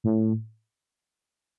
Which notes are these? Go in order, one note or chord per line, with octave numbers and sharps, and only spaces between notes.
A2